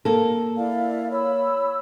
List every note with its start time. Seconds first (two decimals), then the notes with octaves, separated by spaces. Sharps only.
0.05 A#3 A4
0.57 E4 D5 F5
1.11 C#5 B5 E6